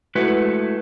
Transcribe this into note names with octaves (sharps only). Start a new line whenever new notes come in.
G#3 A3 E4 F#4 B4